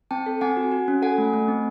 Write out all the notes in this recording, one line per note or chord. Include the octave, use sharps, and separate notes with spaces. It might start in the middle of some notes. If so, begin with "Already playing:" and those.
C4 G5 A5
A4
C4 F#5 G#5
F#4
F#4
C#4
A4 F#5 G#5
A3
A3
C4